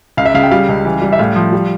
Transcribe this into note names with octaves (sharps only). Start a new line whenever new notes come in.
C#2 F5
E5
C#3 F5
G5
G3 F5
C#2
E3
G3
E5
A2 F5
F3
G3